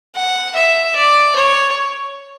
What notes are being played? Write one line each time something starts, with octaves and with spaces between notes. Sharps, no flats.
F#5
E5
D5
C#5